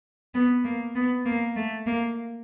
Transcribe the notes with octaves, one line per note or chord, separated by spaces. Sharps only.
B3
A#3
B3
A#3
A3
A#3